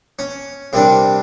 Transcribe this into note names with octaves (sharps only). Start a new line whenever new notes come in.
C#4
C3 G3 D4 A#4